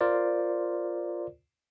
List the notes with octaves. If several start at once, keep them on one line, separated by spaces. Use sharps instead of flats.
F4 A#4 C5 D5